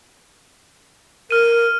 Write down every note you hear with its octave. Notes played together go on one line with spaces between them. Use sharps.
A#4 F6 D#7